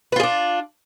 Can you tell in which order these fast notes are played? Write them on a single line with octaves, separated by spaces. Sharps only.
B4 F4 G#4 D4